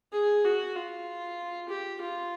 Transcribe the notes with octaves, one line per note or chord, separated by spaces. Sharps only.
G#4
F#4
F4
G4
F4